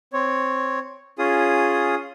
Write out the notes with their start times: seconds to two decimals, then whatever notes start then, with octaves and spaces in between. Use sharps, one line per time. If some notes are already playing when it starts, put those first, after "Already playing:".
0.13 C4 C#5
1.19 C#4 F4 G#4 D#6